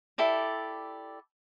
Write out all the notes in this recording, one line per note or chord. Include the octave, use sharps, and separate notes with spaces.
E4 G4 A4 D5